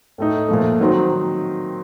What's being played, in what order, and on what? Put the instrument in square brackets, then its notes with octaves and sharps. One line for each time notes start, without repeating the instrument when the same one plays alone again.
[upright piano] A2 A3 D#4
A#2 F3 A3
D#3 F#3 C4 D#4